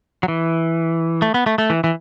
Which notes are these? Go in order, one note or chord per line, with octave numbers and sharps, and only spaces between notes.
F#3
E3
A3
B3
A3
A3
E3
E3